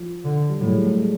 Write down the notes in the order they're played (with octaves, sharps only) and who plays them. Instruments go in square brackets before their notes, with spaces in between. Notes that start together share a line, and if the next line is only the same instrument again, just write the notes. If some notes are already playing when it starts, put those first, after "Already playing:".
Already playing: [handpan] F3
[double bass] D3
[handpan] G3
[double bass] A2 [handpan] F#3
[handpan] G#3
G3
A3
G#3